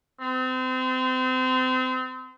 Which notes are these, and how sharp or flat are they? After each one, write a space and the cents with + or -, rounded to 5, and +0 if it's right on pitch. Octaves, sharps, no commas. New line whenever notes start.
C4 -30